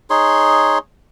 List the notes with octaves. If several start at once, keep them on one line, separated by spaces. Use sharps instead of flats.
D#4 G#4 C#5 C6